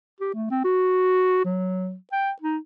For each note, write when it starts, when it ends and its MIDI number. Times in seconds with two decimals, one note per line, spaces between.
0.21 0.31 67
0.34 0.50 57
0.51 0.62 60
0.64 1.44 66
1.45 1.95 54
2.12 2.31 79
2.42 2.58 63